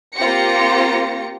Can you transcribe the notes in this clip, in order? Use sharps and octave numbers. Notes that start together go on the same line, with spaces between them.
A#3 C4 F4 G4 A#6 C#7